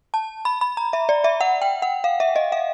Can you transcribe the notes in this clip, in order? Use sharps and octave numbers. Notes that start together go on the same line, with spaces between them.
A5
B5
B5
A#5
E5
D5
E5
F#5
G5
F#5
F5
E5
D#5
F5